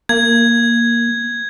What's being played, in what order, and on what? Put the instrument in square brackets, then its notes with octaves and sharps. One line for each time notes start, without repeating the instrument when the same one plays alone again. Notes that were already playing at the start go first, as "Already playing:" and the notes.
[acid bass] A#3 [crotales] G#6